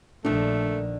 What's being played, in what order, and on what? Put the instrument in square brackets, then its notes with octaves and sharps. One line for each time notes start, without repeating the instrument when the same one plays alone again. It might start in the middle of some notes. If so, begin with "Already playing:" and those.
[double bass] A#1 [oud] D3 D#3 [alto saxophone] A3 [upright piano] D4